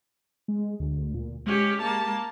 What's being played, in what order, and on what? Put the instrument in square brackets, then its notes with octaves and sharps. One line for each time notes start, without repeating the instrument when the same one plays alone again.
[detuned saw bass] G#3
D2
A#2
[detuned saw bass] G#3 [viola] C#4 G4
[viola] A#3 A5